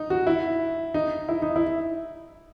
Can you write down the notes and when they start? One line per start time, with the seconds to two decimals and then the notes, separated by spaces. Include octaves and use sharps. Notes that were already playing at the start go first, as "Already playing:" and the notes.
Already playing: D#4
0.10 F#4
0.27 E4
0.94 D#4
1.29 E4
1.42 D#4
1.56 E4